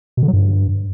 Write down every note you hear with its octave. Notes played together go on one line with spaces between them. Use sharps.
B2
D3
F#3
G2